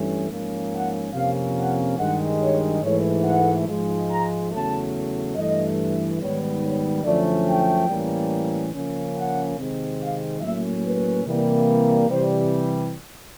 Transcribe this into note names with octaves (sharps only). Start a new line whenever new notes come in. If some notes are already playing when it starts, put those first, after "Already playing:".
Already playing: G2 E3 A3 C#4
G#2 F3 A#3 C#4
F#5
F2 C3 F3 A#3 C#4 F5
F#5
G2 D#3 G#3 F#5
C#5
G#2 E3 A3 C#5
F#5
G#2 F3 G#3
A#5
E2 C#3 F#3 A3 A5
G2 E3 A3 D#5
G#2 D#3 G3 B3 C#5
C#5
F#2 D3 F3 A3 C#4 D5
G5
A2 E3 G3 A#3 C#4
C#3 F3 A#3 C#4
F#5
C3 D#3 G#3 C4
F5
A2 F#3 A#3 C#4 E5
B4
C3 E3 G3 A#3
C3 E3 G3 C5